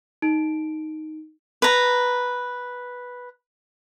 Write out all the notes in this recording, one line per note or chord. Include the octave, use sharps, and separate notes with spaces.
D#4 D7
B4 A#5